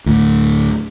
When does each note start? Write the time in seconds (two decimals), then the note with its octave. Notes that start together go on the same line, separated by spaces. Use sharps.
0.06 D2 A2